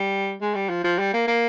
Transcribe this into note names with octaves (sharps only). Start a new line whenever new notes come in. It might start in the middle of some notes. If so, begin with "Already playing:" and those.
Already playing: G3
G#3
G3
F3
F3
G3
A#3
A#3